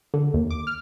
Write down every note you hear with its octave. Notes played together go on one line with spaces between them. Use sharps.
D3
D#2
D6
F6